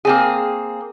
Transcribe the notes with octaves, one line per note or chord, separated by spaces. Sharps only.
A#3 C4 G#4